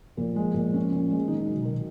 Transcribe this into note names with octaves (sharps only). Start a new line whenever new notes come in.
A#2 F3
G#3
A#2
C#4
A#2
G#3
D#3 D#4
F#3
B2
D#3